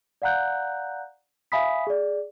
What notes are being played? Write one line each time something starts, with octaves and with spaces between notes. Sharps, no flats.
D5 F5 F#5 A#5 F#6 G6
E5 F5 G#5 B5 D#6 B6
G#4 D5